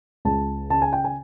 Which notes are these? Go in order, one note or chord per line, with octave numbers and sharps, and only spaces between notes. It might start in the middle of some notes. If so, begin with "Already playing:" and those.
C#2 A5
C#3 A5
G#5
G5
G#5